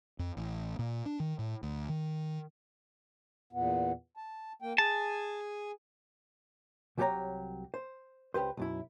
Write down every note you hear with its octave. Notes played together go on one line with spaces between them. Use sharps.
F2
A1
A#2
D4
D#3
A2
D2
D#3
E2 A#2 B3
A5
A#3 G5
G#4 G#5 A5
C2 F#3 G4 G#4 C#5 A#5
C5
C#2 G4 B4 C5
B1 F#2 E4